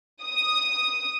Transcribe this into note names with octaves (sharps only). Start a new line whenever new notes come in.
D#6